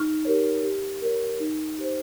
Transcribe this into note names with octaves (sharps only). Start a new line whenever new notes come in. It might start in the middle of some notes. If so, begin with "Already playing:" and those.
Already playing: D#4 C#6 F6
G4 A#4 C#5
G4
A#4 C#5
D#4
G4 C5